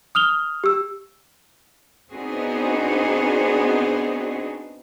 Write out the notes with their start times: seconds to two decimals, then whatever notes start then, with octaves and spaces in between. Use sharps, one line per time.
0.15 D#6 F6 F7 G7
0.64 G4 E6
2.13 B3 C4 D4 D#4 F#4 G#4